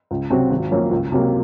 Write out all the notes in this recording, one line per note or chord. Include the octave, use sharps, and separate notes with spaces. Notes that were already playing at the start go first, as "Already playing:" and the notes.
C#2
C3 F#3 C4 F#4
G#1
F#2 F3 A#3 C#4
C#2
C3 F#3 A#3